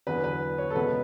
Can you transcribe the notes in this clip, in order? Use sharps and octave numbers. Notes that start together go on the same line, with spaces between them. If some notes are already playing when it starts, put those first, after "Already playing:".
E2 D3 F#3 B3 B4
B4
C#5
A4
C#2 B2 G#3 B3 B4